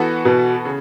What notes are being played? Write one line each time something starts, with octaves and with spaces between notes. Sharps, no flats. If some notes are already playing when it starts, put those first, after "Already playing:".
Already playing: E3 B3 F#4 A4
B2
C#3